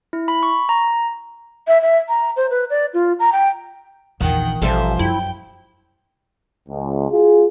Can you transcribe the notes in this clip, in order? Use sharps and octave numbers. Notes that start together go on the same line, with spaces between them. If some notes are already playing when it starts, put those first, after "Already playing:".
E4
B5
C#6
A#5
E5
E5
A#5
C5
B4
D5
F4
A#5
G5
A#1 E2 D#3 F#5 G5
A1 B2 F3 G3 A4 C5 E5
F#2 E4 G5
C#2
F4 F#4 G#4